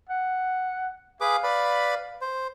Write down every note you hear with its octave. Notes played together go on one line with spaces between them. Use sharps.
F#5
G#4 B4 F5 D6
B4 D5 B5
C5